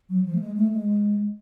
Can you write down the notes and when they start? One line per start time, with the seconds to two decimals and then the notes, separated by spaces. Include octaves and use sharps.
0.09 F#3
0.25 F3
0.35 A3
0.41 G#3
0.56 A3
0.72 G#3